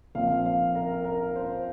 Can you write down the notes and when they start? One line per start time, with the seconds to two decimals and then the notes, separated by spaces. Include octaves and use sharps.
0.15 A#1 A#2 F3 C4 F5
0.46 F5
0.75 A#4
1.04 A#4
1.35 C5